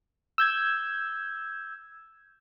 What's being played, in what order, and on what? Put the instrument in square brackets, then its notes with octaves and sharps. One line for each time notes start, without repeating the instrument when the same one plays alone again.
[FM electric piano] E6 G6 G#6